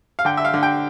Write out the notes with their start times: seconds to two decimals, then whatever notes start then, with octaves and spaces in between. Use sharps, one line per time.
0.19 F5
0.25 D3 G5
0.37 E5
0.45 F5
0.54 D3
0.63 G5